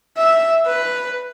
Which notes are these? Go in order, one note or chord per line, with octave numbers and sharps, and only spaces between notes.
E5
B4